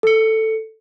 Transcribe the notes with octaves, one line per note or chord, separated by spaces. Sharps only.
A4 C#7